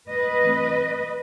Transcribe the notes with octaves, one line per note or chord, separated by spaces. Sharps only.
B4 D#5
E3 A3 C4